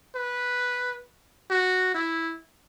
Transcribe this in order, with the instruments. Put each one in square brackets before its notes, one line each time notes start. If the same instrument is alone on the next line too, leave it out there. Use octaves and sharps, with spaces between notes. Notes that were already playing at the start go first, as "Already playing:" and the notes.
[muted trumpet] B4
F#4
E4